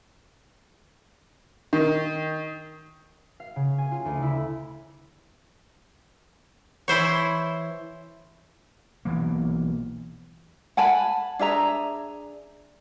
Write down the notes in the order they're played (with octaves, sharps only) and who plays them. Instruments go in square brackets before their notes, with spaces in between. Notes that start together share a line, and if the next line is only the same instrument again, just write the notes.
[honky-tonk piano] D#3
[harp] F5
C#3
G#5
F4
D2
E4
[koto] E3 E4 C5 C#5
[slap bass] B1 E3 A#3
[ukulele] F#5 G#5 A5 B5
D4 G#4 E5 A#5